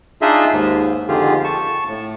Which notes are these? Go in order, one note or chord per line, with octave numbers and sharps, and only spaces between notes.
D4 D#4 F4 G#4 D#5 E5
D#2 G#2
F2 D3 D#3 F4 G4 G#4
A5 C#6
A2